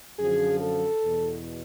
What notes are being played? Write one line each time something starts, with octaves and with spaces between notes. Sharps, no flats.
F#2 D3 F3 G#4
A4
E2 B2